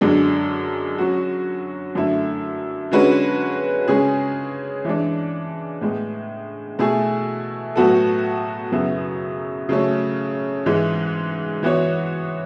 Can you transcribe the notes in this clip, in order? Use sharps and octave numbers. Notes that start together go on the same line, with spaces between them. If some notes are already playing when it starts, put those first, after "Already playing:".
F#2 D3 G#3 D4
F#3 C#4 F#4
F#2 D3 A3 E4
D3 G#3 C#4 F#4 B4
C#3 G#3 C#4 G#4
E3 G#3 D4
A2 G#3 B3
B2 A3 E4 G#4
A2 F#3 B3 F#4 A4
F#2 C#3 F#3 B3 E4
C#3 F#3 A3 C#4
G#2 E3 G#3
E3 B3 F#4 C#5